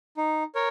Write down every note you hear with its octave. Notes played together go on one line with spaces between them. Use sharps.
D#4
A#4 C#5